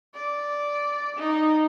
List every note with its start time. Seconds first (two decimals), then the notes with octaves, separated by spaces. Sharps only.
0.15 D5
1.17 D#4